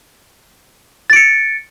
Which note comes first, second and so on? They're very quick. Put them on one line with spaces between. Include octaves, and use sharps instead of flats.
A6 D7 C#7